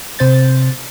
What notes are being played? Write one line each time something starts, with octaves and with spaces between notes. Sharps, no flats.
C3 C4 C5 G6 A6